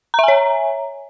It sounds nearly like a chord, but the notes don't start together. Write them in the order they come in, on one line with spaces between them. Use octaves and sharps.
A#5 E5 G#5 C#5